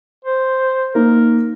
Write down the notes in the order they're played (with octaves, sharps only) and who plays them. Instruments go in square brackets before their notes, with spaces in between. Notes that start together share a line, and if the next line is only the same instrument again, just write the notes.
[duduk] C5
[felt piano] A#3 D#4 [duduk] A#4